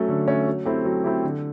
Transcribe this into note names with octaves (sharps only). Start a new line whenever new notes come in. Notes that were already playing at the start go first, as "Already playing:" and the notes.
Already playing: F#3 A3 C#4
D3
F#3 A3 C#4
F#3
A3 C4 E4 G4
F#3
A3 C4 E4 G4
D3